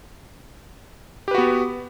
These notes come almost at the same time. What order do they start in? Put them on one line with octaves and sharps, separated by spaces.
G4 B4 F#4 B3